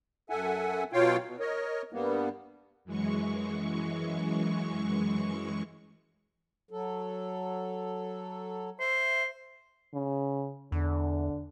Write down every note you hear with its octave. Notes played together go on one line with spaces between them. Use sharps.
F#2 A4 E5 F#5 G#5
B2 F#3 F4 C#5 F5 G5
B2
A#4 C#5 D#5
G2 G3 A#3 B3
F#2 E3 G#3 C#6
F#3 A4
C5 E5
C#3
E2 D3